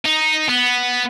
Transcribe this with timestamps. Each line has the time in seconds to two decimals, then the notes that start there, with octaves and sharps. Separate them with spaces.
0.06 D#4
0.49 B3